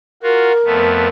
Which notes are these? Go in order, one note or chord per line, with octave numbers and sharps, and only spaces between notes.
F4 F#4 A#4
F2 A3 B3